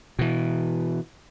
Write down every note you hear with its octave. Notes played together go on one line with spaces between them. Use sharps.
B2 E3